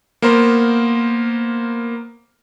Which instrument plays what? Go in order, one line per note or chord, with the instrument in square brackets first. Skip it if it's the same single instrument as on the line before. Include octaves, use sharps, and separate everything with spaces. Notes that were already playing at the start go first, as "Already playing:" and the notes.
[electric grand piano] A#3 B3 A#4 C5